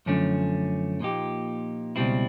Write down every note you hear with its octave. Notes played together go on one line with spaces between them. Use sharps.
F#2 D3 F3 A3 C#4
A#2 F3 A#3 D#4 G4
C#2 B2 G3 C4 E4